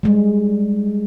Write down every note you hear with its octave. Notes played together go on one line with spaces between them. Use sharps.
G3 G#3